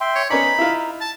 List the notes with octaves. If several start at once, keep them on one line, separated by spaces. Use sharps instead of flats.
E5 G5 C6
C#5
B3 C#4 D#4 D5 B5
E4 F4
A5